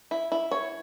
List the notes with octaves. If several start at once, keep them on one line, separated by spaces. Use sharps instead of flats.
E4
E4
C#5